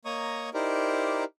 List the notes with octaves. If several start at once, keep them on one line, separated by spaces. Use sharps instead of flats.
A#3 C#5 D#5 A#5 C#6 D#6
D#4 E4 G4 A#4 C5 D5